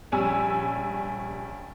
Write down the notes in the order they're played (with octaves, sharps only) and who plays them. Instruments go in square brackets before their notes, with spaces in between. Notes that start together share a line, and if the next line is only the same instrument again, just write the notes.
[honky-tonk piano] A#1 G3 C#4 G#5 E6